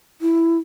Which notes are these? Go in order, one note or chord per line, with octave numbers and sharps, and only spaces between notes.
E4